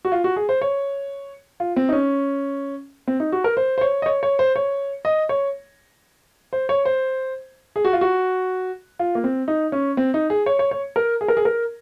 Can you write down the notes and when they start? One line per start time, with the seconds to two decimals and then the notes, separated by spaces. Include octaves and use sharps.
0.05 F#4
0.12 F4
0.24 F#4
0.36 G#4
0.49 C5
0.61 C#5
1.60 F4
1.76 C4
1.89 D#4
1.93 C#4
3.08 C4
3.20 D#4
3.32 F#4
3.44 A#4
3.57 C5
3.78 C5
3.81 C#5
4.02 D#5
4.06 C#5
4.23 C#5
4.39 C5
4.56 C#5
5.05 D#5
5.29 C#5
6.53 C5
6.69 C#5
6.85 C5
7.76 G#4
7.85 F#4
7.93 F4
8.01 F#4
8.99 F4
9.15 A#3
9.24 C4
9.48 D#4
9.72 C#4
9.97 C4
10.14 D#4
10.30 G#4
10.46 C#5
10.59 C#5
10.71 C#5
10.96 A#4
11.21 G#4
11.28 A#4
11.37 G#4
11.45 A#4